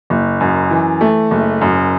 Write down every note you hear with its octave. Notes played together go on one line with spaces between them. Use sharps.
F#1
F#2
E3
A3
F#1
F#2